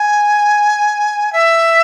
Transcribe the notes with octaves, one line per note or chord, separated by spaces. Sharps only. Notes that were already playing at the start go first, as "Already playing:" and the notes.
Already playing: G#5
E5